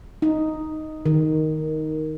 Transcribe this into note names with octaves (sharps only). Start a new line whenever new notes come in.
D#4
D#3